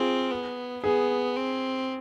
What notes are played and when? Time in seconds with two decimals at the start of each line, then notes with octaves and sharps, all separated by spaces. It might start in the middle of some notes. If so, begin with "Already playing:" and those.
Already playing: C4 F4 G#4
0.31 B3
0.83 B3 G#4
1.36 C4